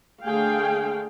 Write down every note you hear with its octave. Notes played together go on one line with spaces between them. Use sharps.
D3 A3 G#4 F5 G5